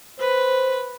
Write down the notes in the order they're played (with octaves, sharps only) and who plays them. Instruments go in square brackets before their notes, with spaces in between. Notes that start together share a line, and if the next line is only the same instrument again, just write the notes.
[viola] B4 [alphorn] C5